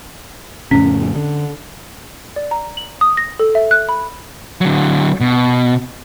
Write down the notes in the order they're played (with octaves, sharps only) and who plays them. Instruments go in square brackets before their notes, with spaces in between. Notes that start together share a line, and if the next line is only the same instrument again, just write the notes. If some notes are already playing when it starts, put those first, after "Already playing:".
[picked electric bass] F2 A2 C#3 [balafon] C#4
[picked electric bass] D3
[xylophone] D5
A#5
F#7
D#6
A#6
A4
E5
F#6
B5
[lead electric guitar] D3 F#3
B2